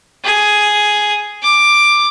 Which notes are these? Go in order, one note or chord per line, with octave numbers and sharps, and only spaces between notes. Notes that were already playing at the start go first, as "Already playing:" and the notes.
G#4
D6